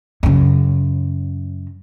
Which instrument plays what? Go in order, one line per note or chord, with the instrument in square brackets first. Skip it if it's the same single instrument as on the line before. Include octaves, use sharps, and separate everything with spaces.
[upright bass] F#2 C#3